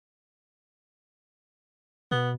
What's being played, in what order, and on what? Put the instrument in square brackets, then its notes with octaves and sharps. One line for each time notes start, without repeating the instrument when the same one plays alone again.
[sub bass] B2 [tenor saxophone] B3